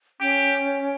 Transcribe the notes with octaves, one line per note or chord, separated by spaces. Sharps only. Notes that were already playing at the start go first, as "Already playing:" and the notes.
C#4 G4